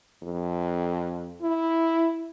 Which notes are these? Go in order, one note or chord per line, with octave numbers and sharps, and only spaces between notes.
F2
E4